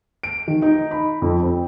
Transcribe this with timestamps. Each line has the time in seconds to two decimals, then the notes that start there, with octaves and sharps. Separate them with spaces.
0.23 D7
0.48 D#3
0.62 D#4
0.91 B5
1.22 F2
1.43 C4